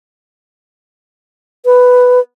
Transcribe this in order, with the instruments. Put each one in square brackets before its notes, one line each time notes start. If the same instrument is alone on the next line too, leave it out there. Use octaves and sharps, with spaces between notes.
[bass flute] B4